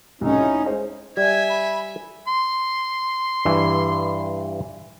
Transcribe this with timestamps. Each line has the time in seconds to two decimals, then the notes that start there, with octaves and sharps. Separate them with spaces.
0.21 C2 A2 C#3 C#4 D#4
0.40 E4
0.66 G#3 C5 D#5
1.17 G3 E5 G#5 G#6
1.50 B5
2.27 C6
3.45 G2 E3